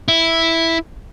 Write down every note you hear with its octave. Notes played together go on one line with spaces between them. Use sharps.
E4